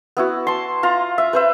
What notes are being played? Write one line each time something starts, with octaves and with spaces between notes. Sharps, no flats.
B3 E4 F#4
A5 C6
F4 A#5
E5
B4 C5 E5